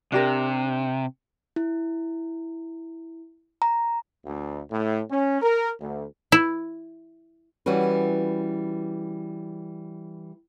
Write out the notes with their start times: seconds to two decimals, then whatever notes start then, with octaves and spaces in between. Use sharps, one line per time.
0.12 C3 D4 G4 A#4
1.56 E4
3.62 A#5
4.25 D2
4.71 A2
5.10 C#4
5.42 A#4
5.81 D2
6.32 E4
7.66 E3 G3 C#4 F#4 B4